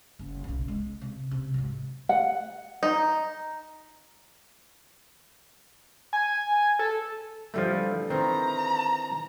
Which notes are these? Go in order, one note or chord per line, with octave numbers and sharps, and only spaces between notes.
F#1
B1 C#3
G#3
C3
C3
G#2 F#3
F#5
D#4
G#5
A4
D3 E3 F3 G3 A3 A4
D#3 E3 C4 A4 A#5